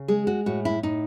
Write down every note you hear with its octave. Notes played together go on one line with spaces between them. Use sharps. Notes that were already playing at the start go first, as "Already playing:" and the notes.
Already playing: C#3
G#3 G#4
F#4
A2 F#4
E4
A2 D#4